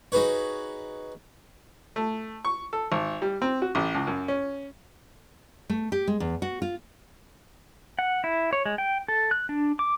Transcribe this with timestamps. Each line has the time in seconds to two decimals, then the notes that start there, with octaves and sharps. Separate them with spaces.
0.12 D#4 F#4 G#4 B4 C#5
1.96 A3
2.45 C#6
2.73 A4
2.92 G#1
3.22 G3
3.42 C4
3.62 F#4
3.75 A1
3.95 C#2
4.07 F#2
4.28 C#4
5.70 A3
5.92 G4
6.08 G#3
6.20 E2
6.42 F#4
6.62 F4
7.99 F#5
8.24 E4
8.53 C#5
8.66 G#3
8.78 G5
9.08 A4
9.31 F#6
9.49 D4
9.79 D6